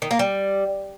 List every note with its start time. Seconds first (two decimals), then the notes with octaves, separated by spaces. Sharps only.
0.02 D#3
0.11 A#3
0.19 G3